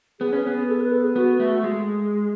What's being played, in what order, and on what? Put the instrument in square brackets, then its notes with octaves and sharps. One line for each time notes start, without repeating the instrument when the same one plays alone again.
[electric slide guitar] B3 [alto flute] G#4
[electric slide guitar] C#4
B3
[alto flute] A4
B4
A4
G#4
[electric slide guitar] B3 [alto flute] F#4
[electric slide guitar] A3
[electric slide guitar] G#3 [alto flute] G#4